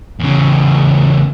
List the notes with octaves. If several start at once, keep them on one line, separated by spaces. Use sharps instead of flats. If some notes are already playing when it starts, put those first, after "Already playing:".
E2 C#3